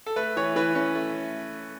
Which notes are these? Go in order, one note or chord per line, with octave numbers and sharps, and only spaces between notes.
A4
A3 B4
E3 C#5
E3 B4
C#4
A3